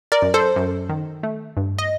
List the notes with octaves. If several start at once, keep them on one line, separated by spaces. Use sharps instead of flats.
A#4 D5
F#2
A4 C5
F#2
D#3
A3
G2
D#5